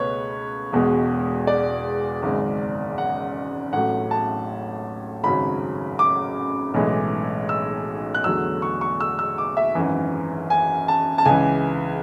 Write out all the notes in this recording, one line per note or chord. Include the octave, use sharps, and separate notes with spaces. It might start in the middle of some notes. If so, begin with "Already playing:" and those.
Already playing: C#2 B2 A3 B4 C#5
E1 E2 B2 G#3
D5
G#1 F#2 C#3 G#3
F#5
A1 A2 F#3 A3 F#5
A5
G#1 F#2 C#3 F#3 B5
D6
B1 A2 E3 G#3
E6
F#6
E2 D3 F#3 A3 E6
C#6
C#6
E6
E6
D6
E5
G#1 F#2 E3
G#5
A5
A5
C#2 C#3 E3 G#5